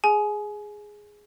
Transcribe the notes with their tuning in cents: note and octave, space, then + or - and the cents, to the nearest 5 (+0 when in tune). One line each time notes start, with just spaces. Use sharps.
G#4 +0 G#5 +25